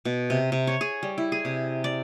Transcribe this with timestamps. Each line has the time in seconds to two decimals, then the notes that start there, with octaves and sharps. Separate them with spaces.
0.05 B2
0.30 C3
0.52 C3
0.67 C#5
0.81 G#4
1.03 G3
1.18 E4
1.32 G#4
1.45 C3
1.84 D5